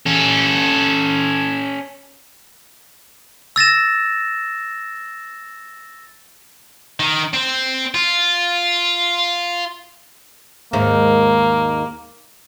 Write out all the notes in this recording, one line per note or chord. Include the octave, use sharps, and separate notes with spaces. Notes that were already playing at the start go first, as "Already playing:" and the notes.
C#4 A4
E6 A6 A#6 E7
D#3
C4
F4
D#2 G#2 D#3 A#3